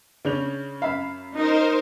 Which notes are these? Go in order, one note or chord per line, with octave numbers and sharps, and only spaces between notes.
C#3 C#4 D4 G6 F7
F#2 E5 F5 B5
D#4 A#4 C5